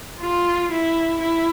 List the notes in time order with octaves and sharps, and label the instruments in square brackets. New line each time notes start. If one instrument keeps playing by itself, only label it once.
[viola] F4
E4
E4